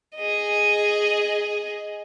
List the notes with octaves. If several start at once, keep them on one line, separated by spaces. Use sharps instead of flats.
G#4 D#5